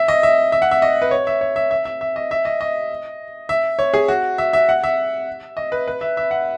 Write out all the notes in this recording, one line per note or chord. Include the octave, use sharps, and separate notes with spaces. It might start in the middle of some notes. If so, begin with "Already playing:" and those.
Already playing: E5
D#5
E5
E5
F#5
E5
D#5
B4
C#5
E5
C#5
E5
E5
E5
E5
D#5
E5
D#5
D#5
E5
C#5
G#4
F#4
E5
E5
F#5
E5
D#5
B4
B4
E5
E5
F#5